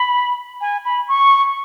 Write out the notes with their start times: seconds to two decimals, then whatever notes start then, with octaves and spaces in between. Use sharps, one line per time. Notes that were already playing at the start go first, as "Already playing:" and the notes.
Already playing: B5
0.61 G#5
0.85 B5
1.08 C#6